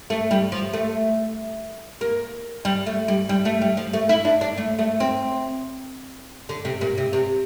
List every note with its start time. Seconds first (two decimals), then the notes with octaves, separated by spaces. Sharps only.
0.10 A3
0.31 G3
0.52 F3
0.73 A3
2.01 A#3
2.65 G3
2.86 A3
3.08 G3
3.29 G3
3.45 A3
3.61 G3
3.77 F3
3.93 A3
4.09 E4
4.25 D4
4.41 D4
4.58 A3
4.79 A3
5.00 C4
6.49 D3
6.65 C3
6.81 A#2
6.98 C3
7.13 C3